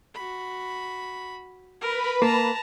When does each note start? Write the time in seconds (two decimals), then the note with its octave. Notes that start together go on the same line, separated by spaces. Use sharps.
0.15 F#4 B5
1.81 A#4 B4 B5
2.22 A#3 A5 A#5